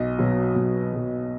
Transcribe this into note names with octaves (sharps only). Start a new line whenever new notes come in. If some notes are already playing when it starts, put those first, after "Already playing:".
Already playing: B1 D#5
B2 F#3
B1
B2 F#3